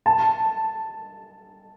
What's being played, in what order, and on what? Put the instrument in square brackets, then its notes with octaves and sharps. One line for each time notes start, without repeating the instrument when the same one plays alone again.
[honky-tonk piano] A5